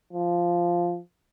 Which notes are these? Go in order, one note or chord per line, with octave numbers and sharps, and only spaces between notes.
F3